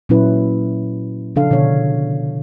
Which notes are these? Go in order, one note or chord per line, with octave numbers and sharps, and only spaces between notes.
A#2 F#3 C#4 E4 B4
C#3 F3 D4 A4 F5
B2 D3 D4 C#5